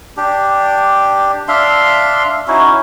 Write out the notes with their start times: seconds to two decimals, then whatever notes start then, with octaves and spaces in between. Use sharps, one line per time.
0.17 D4 G4
1.48 D4 E5 F5 C6
2.48 C#4 D#4 E4 F#4